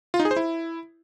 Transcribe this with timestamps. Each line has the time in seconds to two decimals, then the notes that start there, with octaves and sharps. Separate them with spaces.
0.14 F4
0.20 D#4
0.25 G#4
0.31 C5
0.36 E4